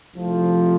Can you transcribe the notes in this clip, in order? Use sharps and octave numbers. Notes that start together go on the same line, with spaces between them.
C2 C3 F3 A3